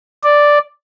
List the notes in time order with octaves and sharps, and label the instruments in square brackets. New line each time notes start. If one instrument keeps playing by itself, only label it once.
[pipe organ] D5